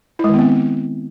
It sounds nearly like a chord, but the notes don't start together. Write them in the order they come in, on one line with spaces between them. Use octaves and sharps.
E4 G#3 D#3 B3 C4